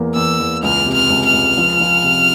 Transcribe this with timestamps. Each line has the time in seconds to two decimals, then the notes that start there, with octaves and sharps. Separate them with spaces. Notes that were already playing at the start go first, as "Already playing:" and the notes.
Already playing: E2 A#3
0.15 E2 E6
0.39 E2
0.63 C#2 F6
0.86 C3
0.94 F6
1.10 C#2
1.26 F6
1.33 C#2
1.57 F3
1.80 F3
2.03 C3